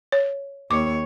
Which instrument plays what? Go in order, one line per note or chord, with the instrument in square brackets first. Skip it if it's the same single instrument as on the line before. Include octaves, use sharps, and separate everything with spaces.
[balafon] C#5
[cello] D#2 C#5 [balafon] D6